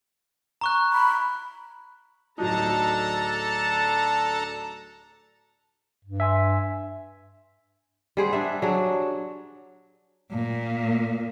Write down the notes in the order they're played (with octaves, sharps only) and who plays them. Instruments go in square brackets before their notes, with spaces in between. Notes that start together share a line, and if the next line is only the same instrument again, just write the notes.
[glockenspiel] A#5 C#6 F#6
[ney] B5
[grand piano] D1 F#3 D#4 [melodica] D4 [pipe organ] A4 A5 A#5
[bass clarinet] G2
[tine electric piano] E5 G#5 C6
[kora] G3 G#4 C5 F#5
D4 E5
F#3 D4 G#4
[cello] A#2